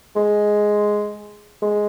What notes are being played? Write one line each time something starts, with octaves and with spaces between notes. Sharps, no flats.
G#3
G#3